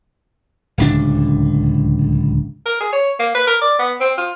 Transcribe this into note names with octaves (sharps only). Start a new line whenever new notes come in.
D1 C#2 D4
A#4
G#4
C#5
A#3
B4
A#4
D5
B3
C4
F4